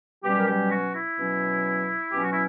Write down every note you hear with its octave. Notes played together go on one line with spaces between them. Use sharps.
B2 F#3 G3 C#4 G4
A#4
G3 G4
F#4
E4
B2 F#3 C#4
B2 F#3 C#4 G4
F#4
E4